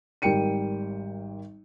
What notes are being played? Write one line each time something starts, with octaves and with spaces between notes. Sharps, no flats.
G#1 G3 A#4 G5 C#7 D#7